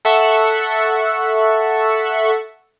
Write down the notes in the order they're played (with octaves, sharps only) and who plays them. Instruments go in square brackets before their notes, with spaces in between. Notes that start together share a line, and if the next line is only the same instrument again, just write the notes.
[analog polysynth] A4 E5 F#5 C#6